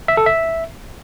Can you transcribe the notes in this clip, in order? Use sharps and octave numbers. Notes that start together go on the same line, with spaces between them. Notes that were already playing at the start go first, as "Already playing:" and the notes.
E5
A4
E5